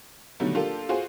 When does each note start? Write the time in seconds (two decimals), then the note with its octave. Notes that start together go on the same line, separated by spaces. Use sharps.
0.40 B2 D3 D#3 F#3 G3 A3
0.54 A#3 D4 F4 G4 A4
0.89 F4 F#4 G#4 C5